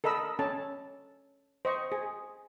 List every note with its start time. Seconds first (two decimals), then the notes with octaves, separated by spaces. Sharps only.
0.04 A4 A#4 D#5 B5 E6
0.39 C#4 A4 A5
1.65 C5 D#5 C#6
1.92 G#4